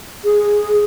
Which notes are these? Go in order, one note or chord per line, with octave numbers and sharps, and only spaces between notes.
G#4